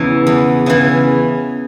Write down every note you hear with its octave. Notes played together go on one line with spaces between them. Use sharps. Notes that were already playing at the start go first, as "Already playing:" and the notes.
Already playing: E2 C#3 E3
E2
C#3 E3